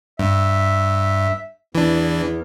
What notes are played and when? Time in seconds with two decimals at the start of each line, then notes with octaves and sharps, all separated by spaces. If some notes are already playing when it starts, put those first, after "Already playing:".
0.19 G2 E5
1.75 E2 E3 D4